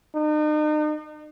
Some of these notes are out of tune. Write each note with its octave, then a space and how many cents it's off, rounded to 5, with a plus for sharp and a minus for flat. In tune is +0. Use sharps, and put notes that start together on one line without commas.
D#4 -40